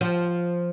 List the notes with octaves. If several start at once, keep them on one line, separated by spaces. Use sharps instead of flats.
F3